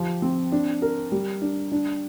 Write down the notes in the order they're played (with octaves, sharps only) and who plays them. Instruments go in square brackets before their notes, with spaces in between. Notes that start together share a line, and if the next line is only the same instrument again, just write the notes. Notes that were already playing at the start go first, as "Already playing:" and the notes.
Already playing: [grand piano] F3 G4
C4
D4
A#4
G3
D4
D4